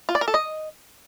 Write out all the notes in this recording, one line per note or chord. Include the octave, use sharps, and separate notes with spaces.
F4
D5
A#4
A4
D#5